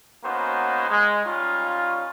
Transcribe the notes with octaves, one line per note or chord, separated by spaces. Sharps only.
A#3 B3 C#4 D#4 F#4 C5
G#3
G3 C#4 D#4 F4